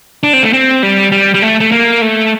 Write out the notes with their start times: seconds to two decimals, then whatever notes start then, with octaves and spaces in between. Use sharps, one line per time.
0.23 D4
0.33 C4
0.43 A3
0.53 C4
0.83 G3
1.12 G3
1.34 G3
1.42 A3
1.60 A3
1.72 A#3
2.01 A3